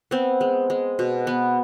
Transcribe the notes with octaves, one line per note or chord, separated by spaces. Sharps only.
B3 C4
G#3
G#3
B2
B3